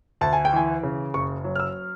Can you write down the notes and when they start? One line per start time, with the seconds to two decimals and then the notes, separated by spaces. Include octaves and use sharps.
0.21 D2 A5
0.33 G#5
0.45 G5
0.53 E3 G#5
0.83 C#3
1.14 F#1 C#6
1.44 F#3
1.56 F6
1.60 E6